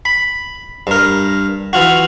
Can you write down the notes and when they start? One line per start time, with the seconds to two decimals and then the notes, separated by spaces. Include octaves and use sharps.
0.05 B5
0.87 G2 A#4
1.73 E3 F4 F#4